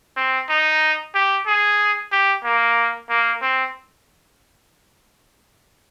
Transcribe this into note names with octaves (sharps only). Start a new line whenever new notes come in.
C4
D#4
G4
G#4
G4
A#3
A#3
C4